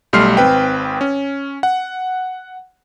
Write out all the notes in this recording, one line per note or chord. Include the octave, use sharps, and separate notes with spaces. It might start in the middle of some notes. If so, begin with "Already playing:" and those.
B1 G3 A3 C6 F6 C7
G#1 C4 B4 G5
C#4
F#5